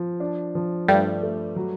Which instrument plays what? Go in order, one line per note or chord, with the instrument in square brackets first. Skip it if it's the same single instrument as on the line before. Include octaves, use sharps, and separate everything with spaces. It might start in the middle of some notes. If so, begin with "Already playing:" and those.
Already playing: [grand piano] F3
D4
F3
[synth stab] G2 G3 [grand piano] A3
[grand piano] A3
F#3